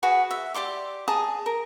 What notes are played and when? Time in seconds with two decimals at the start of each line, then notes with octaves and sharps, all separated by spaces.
0.03 F#4 G#4 B4
0.31 E5
0.54 G4 D5 C6 D6
1.08 G#4 A5 A#5 D#6
1.46 A#4